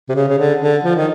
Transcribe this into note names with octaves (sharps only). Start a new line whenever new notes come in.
C3
C#3
C#3
D3
D3
F3
D#3